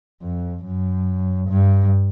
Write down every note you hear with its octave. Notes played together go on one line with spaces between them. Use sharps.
F2
F#2
G2